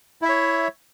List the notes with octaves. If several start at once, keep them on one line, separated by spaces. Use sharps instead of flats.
E4 C#5 E5